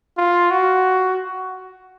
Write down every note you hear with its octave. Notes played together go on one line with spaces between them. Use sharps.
F4
F#4